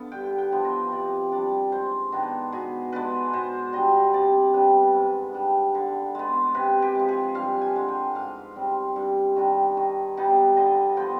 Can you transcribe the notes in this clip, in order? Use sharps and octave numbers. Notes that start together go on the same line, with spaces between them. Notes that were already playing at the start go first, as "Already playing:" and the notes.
Already playing: D3 B3 F5
G2 G5
G5
F3 B3 D4
D#5
C3 D5
G3 D4 D5
G#2 C5
D#3 B3 D4
B2 G#4
G#3 B3 D4 B4
B2 C5
G3 D4 D#5
C3 D5
G3 B3 D4 B4
G#2
G3 D4
D3
G#3 B3
C3 B4
G4
F3 G#3
G#4
G2 F5
G#5
D3 G#3
G5
G#2 F5
G3 C4
G2
D#3 G3 D4
D#3
G3 B3 D#4
D3 D#5
F3 B3 G5